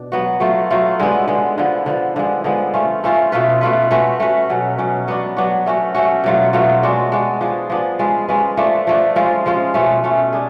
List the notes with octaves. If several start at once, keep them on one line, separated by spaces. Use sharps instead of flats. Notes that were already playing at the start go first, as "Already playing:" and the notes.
Already playing: B2 D4
F#3 B3 F#4
F#3 A3 F4
F#3 A3 F4
D3 G#3 B3
D3 G#3 B3
D3 F3 B3
D3 F3 B3
D3 F3 G#3 B3
D3 F3 G#3 B3
A3 C#4 F4
A3 C#4 F4
B2 A3 F4 B4
B2 A3 F4 B4
A3 C#4 F#4 B4
A3 C#4 F#4 B4
B2 F#3 C#4
B2 F#3 C#4
F#3 B3 D4 F#4
F#3 B3 D4 F#4
A3 C#4 F#4
A3 C#4 F#4
B2 F#3 A3 F4
B2 F#3 A3 F4
G#3 D4 F#4
G#3 D4 F#4
F3 B3 D4 G#4
F3 B3 D4 G#4
G#3 C#4 F4 B4
G#3 C#4 F4 B4
F3 A3 D4
F3 A3 D4
F3 G#3 C#4 F4
F3 G#3 C#4 F4
B2 A3 C#4
B2 A3 C#4
D4 G#4